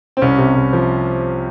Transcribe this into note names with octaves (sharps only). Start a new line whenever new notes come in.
C4
C2 C#4
C3
C2
F3